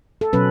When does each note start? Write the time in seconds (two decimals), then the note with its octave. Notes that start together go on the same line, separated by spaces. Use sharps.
0.21 A4
0.33 B2 F#3 C#4 B4